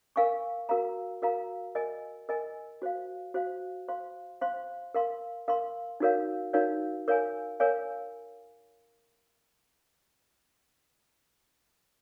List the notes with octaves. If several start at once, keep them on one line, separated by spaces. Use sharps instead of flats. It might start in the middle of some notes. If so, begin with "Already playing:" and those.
A#4 F5 G#5 C#6
F#4 A#4 F5 A#5
F#4 A#4 F5 A#5
A#4 D#5 G#5
A#4 D#5 G#5
F#4 C5 F5
F#4 C5 F5
C5 F5 C6
C5 F5 C6
A#4 F5 C6
A#4 F5 C6
D#4 F#4 A#4 C#5 F5
D#4 F#4 A#4 C#5 F5
A#4 C#5 F5 G#5
A#4 C#5 F5 G#5